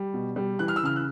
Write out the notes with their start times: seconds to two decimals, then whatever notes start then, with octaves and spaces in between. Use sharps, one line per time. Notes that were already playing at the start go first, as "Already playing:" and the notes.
Already playing: G3
0.14 B2
0.36 G3
0.59 E3 F#6
0.68 F6
0.76 E6
0.83 C#3 F6
0.96 F#6